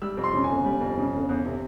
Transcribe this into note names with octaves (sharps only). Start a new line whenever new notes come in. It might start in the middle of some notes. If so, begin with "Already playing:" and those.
G3 E6
F2
C6
C#3
G#5
G1
G3
F2
C#3
G1
E2
C3